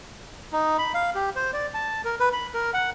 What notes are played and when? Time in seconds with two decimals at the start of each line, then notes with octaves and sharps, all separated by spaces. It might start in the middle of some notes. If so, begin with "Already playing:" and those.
0.52 D#4
0.79 B5
0.94 F5
1.15 G4
1.36 C5
1.53 D5
1.74 A5
2.05 A#4
2.20 B4
2.33 B5
2.54 A#4
2.74 F#5